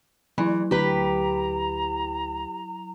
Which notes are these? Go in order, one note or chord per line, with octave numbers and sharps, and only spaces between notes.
E3 F#3 E4
D2 G4 B4 A#5